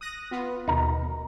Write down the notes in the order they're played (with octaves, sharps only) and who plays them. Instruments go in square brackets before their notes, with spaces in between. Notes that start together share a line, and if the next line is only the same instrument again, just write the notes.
[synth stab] D#6 F#6 A#6
B3 F4 B4
[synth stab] D#2 B2 [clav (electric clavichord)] D#4 A#4